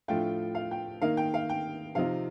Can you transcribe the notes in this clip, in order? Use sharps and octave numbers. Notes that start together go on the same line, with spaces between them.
A2 F3 A3 D4 F4 G5
F5
G5
D#3 A#3 D#4 F5
G5
F5
G5
C3 F3 C4 D#4 F5